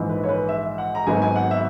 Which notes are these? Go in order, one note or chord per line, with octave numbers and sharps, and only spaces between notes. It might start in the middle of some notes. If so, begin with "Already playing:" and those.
Already playing: A#1 G#2 E3
B4
C#5
B4
E5
F#5
A#5
G#1 G#2 F#3 B3 G#5
G#5
F#5
E5